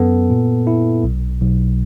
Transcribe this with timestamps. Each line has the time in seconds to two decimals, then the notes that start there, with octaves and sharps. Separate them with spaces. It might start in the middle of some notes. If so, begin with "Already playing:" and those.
Already playing: F#2 B3 A4
0.30 A#2
0.67 E4
1.04 B1
1.41 B1